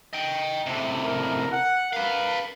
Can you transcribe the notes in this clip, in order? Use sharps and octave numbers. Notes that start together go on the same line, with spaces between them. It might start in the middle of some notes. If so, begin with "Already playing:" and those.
D#5 G5
A2 C3
A#4
F#5
A#4 B4 F5